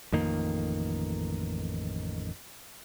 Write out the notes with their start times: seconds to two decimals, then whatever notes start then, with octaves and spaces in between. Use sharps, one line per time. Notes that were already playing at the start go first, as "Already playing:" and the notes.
0.12 A1 F2 D#3 A#3